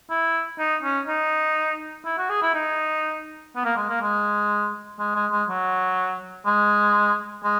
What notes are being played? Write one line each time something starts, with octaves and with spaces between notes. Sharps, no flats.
E4
D#4
C#4
D#4
E4
F#4
G#4
E4
D#4
B3
A#3
G#3
A#3
G#3
G#3
G#3
G#3
F#3
G#3
G#3